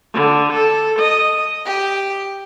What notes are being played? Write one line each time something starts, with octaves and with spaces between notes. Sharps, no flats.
D3
A4
D#5
G4